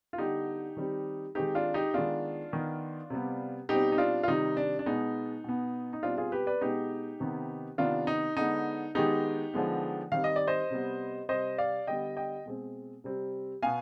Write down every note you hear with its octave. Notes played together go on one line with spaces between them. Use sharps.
F4
D3 G3 B3 D#4 G4
D#3 G3 C4
D#3 G#3 C4 D#4 G4
D4 F4
D#4 G4
D#3 G#3 B3 D4 F4
D#3 B3
C3 G3 B3
B2 G3 C4 D#4 G4
D#4
D4 F4
F4
C3 D#3 G3 D#4
D4
D4
B2 G#3 B3 D#4
B2 B3
D#4
B2 G3 C4 D4 F4
F4 G#4
G4 B4
B4 D5
B2 G#3 B3 D#4 G4
C3 D#3 B3
C3 D#3 B3 D4 F4
D#4
D3 G#3 B3 D#4
D#3 G#3 B3 D#4 G4
D3 F3 G#3 B3
D#3 G3 C4 F5
D#5
D5
C5 D#5
C3 G3 B3
C3 G3 C4 C5 D#5
D5 F5
D3 G3 B3 D#5 G5
D#5 G5
B2 G#3 C4
C3 G3 C4
B2 B3 F5 G#5